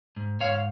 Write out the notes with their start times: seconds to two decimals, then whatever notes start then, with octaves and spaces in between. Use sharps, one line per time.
0.16 G#2
0.40 G#2 C#5 F5